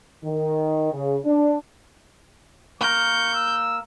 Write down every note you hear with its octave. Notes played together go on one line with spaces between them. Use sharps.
D#3
C#3
D4
A#3 A#4 C#6 G6
E6